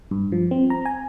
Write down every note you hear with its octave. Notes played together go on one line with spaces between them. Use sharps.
G2
F3
C4
A#5
G#5